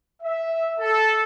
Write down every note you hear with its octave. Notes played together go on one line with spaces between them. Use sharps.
E5
A4